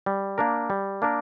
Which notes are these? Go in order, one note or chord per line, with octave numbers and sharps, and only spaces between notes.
G3
A#3 D4 A#4
G3
A#3 D4 A#4